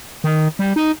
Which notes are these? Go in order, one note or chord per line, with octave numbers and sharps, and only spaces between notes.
D#3
G3
D#4